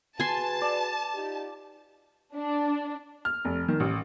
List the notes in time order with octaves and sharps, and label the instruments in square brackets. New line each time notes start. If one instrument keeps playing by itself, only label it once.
[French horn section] F#4 G#4 B4 [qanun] G#5 C6 [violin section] A5
[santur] D5
[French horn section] D#4 F4 G4
[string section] D4
[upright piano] F6
F1
D#3
A1